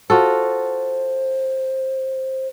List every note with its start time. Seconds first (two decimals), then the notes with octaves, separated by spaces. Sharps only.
0.10 F4 F#4 A4 C5